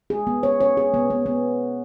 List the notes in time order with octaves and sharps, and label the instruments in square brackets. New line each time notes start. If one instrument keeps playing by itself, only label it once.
[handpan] G#4
B3
C#5
C#5
G#4
B3
B3
B3